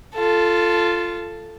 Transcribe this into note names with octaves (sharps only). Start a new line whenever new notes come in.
F4 A4